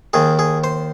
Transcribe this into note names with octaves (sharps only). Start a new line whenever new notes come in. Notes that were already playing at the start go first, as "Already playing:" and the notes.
D#2 D#3 G#4
G#4
C5